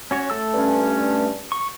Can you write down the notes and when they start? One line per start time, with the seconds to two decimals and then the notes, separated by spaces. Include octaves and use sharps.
0.11 C#4 F#4 C#5
0.30 A3 A4 E6
0.54 G2 C#4
1.52 C#6